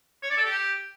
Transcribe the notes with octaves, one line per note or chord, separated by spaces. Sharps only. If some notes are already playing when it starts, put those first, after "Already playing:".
C#5
D5
A4
G4